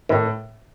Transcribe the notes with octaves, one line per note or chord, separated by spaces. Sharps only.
A2 D#3